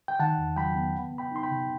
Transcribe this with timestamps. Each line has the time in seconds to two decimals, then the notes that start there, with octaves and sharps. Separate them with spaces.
0.08 G5
0.19 D#3 F#5 A5
0.38 E2
0.56 F#3 G5 B5
0.76 B3
0.94 B3
1.12 B3
1.18 G5 B5
1.31 D#4 C6
1.43 G5 B5
1.51 C3